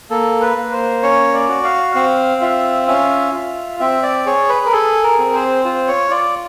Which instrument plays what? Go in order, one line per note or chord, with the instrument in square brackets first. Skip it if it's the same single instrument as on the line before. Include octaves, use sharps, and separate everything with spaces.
[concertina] A#3 A4
B4
A#3
C5
C#4 C#5
D5
F#4
F5
C4 F5
F4 E5
C#4 E5
F4
C4 E5
D5
G#4 C#5
B4
A#4
G#4 A4
A#4
C4
C5
F4 C5
C#5
F4 D5